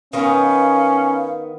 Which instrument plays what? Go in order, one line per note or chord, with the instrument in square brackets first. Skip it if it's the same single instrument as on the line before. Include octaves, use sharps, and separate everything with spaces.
[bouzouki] D#3 B3 [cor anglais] C#4 [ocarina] F5